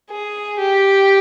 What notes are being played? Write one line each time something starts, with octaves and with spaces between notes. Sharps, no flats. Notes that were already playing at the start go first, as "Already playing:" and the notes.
G#4
G4